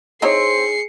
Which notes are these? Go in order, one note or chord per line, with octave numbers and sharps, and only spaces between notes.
C4 D#4 E4 G#4 C#5 C7 C#7